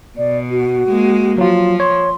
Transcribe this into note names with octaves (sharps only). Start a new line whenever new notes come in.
B2 D5
F#4
G#3 A#3
F3 F#3 F4
C#5 C6